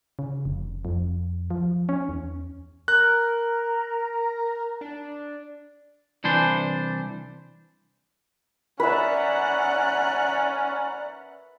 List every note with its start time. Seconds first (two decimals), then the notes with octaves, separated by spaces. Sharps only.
0.19 C#3
0.45 F1
0.85 F2
1.50 F3
1.89 C#4
2.09 E2
2.88 A#4 F#6
4.81 D4
6.24 C2 E3 D4 C5
8.80 C#4 B4 D5 E5 F#5 A#5